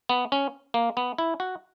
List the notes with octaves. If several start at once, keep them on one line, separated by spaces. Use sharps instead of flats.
B3
C#4
A#3
B3
E4
F#4